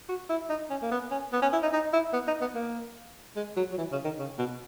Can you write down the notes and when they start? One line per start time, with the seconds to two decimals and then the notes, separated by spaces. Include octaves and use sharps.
0.09 F#4
0.29 E4
0.49 D#4
0.69 C#4
0.82 A#3
0.91 B3
1.10 C#4
1.32 B3
1.42 C#4
1.53 E4
1.62 D#4
1.73 D#4
1.93 E4
2.13 B3
2.27 D#4
2.41 B3
2.55 A#3
3.36 G#3
3.56 F#3
3.72 F#3
3.78 E3
3.92 C#3
4.04 D#3
4.19 C#3
4.38 B2